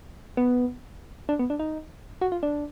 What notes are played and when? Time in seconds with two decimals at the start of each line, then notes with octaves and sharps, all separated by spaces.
0.37 B3
1.29 D4
1.39 B3
1.50 D4
1.60 D#4
2.21 F#4
2.32 F4
2.43 D4